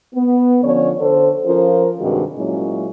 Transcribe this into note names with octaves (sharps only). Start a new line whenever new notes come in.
B3
D3 F3 C#4 C#5 D5
D3 A4 C5
F3 C#4 F4 A#4 C5
G2 C3 D#3 G#3 F#4
A#2 F#3 G#3 C#4 E4